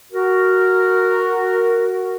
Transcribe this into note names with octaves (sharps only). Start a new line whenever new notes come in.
F#4 A#4